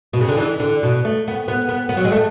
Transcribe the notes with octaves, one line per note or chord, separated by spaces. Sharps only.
B2
C#3
D3
E3
D3
B2
A3
B3
B3
B3
B3
F#3
G#3
A3